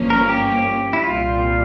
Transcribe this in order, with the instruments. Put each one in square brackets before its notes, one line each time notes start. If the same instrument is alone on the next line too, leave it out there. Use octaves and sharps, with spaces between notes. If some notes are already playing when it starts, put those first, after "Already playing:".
Already playing: [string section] G1 G2 F3 A#3 C#4
[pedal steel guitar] A#4
G4
E4
[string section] C2 A#2 G3 [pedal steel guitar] F4